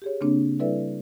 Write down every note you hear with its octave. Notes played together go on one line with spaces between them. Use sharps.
G4 G#4 C#5
C#3 A#3 C4 D4
G3 E4 A4 B4 D5 E5